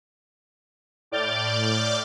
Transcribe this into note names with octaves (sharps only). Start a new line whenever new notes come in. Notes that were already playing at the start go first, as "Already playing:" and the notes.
A2 D5 D6 F6 G6 A6